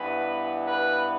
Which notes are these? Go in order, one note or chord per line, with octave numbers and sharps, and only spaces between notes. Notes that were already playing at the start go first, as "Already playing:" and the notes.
Already playing: G2 E3 B3 B4
B4